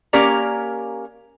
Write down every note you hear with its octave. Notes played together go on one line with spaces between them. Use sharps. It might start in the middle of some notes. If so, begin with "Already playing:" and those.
A#3 C#4 G4 A#4 D5 A#5